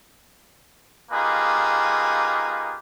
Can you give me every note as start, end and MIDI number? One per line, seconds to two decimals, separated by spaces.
1.12 2.78 58
1.12 2.78 63
1.12 2.78 65
1.12 2.78 67
1.12 2.78 68
1.12 2.78 71